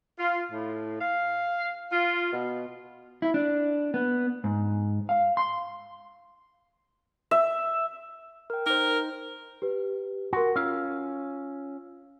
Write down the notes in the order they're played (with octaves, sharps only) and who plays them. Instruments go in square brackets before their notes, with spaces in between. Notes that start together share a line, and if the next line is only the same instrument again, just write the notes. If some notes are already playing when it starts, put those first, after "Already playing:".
[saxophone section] F4
A2
F5
F4
B2
[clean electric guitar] E4
D4
B3
G#2
F5
C6
[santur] E5
[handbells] A#4 G5
[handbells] D#4 C5 [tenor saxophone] A#4
[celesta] G4 B4
[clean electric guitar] F#4 [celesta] A#4 C6 C#6
[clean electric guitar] C#4 F5 [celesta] F4 E6